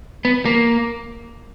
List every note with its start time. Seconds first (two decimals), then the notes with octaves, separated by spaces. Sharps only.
0.25 B3
0.45 A#3